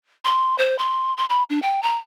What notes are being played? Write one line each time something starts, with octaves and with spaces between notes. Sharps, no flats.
C6
C5
C6
C6
B5
D4
G5
A#5